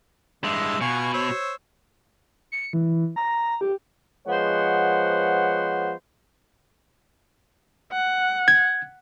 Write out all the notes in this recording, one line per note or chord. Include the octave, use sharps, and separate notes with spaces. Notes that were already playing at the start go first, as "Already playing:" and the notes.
G2 E3 G#3 E5 A5
B2 F4 G#5 C#6
C5 C#5 E6
C#7
E3
A#5
G4
F3 G#3 B3 C5 C#5 F#5
F#5
G#6